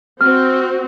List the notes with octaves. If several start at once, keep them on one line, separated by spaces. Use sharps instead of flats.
C4 F#4 F6